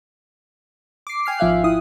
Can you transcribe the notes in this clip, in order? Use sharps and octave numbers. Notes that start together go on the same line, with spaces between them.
D6 C7
G5 G#5 F6 C7
G#1 F3 E5 F5 F#6
E4 D#6